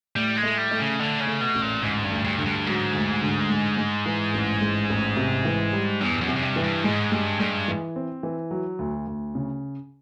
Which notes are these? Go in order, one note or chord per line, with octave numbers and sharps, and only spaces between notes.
A2 G3
G#3
A3
G3
A3
C#3
D3 A3
C#3
A3
B2
A1
A#2
D2 G#2
G2
D2
G2
D3
G2
G#2 F#3
D2
D3
G#3
G#3
E3
A1
G#3
A1
C3
E3
G3
E2 G2
F#2
C3
F#2
G2
E3
G2
G#2 G#3
G2 G#3
G2 G#3
E3
C4
E3
F#3
D2
D2
C#3